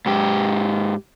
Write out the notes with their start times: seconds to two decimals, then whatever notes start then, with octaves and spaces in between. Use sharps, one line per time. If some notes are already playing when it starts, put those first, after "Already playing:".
0.06 G#2 G4